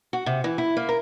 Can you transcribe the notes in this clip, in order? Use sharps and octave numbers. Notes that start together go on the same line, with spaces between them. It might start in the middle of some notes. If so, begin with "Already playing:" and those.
F#4
C3
E3
E4
A#3
A#4